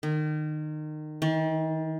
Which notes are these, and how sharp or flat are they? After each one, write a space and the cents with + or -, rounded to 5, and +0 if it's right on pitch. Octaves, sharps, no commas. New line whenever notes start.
D#3 -25
D#3 +40